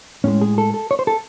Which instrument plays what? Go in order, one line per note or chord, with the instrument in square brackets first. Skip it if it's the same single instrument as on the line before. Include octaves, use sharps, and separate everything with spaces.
[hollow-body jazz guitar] A2 G#3 C#4
G#4
A4
A4
C#5
C5
A4